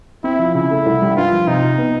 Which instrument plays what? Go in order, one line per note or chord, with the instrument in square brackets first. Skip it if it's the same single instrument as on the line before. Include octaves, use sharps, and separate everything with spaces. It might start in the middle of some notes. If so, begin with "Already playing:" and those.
[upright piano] C4 [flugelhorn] E4
[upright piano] F3
[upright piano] C#3 [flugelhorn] E4
[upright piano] A3
C2
G3
[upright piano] G2 [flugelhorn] F4
[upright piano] F3
[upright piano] C3 [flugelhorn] D#4
[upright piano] C3
B3